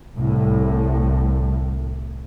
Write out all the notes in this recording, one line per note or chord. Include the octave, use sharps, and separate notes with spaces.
C2 A2